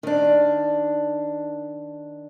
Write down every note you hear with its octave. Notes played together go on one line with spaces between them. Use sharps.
D#3 D4